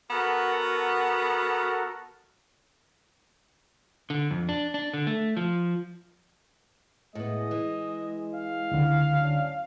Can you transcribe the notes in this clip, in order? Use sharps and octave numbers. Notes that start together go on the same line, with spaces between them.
B3 F#4 A4 A#4
D3
F2
D4
D4
D3
A3
F3
A2 G#3 B3 D#5
E3
F5
C#2 D3
F#3 C#4 D4